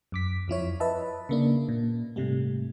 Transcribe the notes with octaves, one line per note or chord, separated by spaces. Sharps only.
F#2 D6 B6
F2 F3 E4 C#5
B4 D#5 E5 A5
C#3 A#3 D4
A#2
G#2 C3 G3 A3